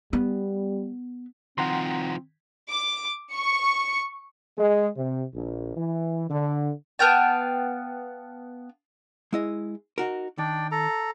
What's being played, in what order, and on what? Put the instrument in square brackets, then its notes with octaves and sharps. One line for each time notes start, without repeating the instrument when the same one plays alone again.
[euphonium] G3 [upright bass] B3
[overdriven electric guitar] D#3 F3 [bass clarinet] C4 [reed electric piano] F#5 A#5 C6
[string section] D6
C#6 C#7
[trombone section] G#3
C3
A#1
E3
D3
[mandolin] B3 F5 G5 A5
[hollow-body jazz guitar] G#3 E4 D#5
D#4 F#4 A#4
[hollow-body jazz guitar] D#3 [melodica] D4 D5 G5
[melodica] A4 A#5